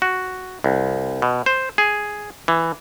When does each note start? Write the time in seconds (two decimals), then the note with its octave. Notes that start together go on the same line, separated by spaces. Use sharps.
0.02 F#4
0.64 C2
1.22 B2
1.46 C5
1.78 G#4
2.48 E3